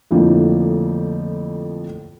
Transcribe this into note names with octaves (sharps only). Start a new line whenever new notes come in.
F2 A2 D3 E3 F3 A#3